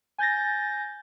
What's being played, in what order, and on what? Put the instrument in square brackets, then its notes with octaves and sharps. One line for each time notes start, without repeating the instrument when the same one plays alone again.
[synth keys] G#5 G6 A6 A#6